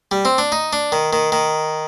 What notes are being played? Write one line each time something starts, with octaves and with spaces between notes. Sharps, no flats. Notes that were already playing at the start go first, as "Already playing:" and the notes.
G3
C4
D4
D#4
D4
D#3
D#3
D#3